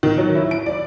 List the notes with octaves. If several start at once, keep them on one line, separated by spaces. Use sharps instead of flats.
D#3
F#3
E4
D7
D5